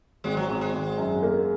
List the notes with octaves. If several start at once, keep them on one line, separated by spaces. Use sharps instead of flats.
G#1 G#3
F#3
G#1 F#3
G#3
G#1
F#2
A#3